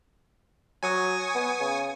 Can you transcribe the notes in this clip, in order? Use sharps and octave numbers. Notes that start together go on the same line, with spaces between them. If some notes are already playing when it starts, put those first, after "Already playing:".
F#3 G#5 C#6 D#6
B3
C#3